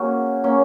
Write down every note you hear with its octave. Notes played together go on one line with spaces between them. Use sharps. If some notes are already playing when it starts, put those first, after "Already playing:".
Already playing: A#3 C#4 F#4 G#4
A#3 C#4